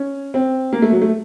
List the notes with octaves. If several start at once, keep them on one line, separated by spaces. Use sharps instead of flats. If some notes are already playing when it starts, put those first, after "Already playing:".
Already playing: C#4
C4
A#3
A3
F#3
A3